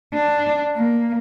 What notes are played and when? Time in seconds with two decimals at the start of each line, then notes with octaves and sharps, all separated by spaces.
0.14 D4
0.76 A#3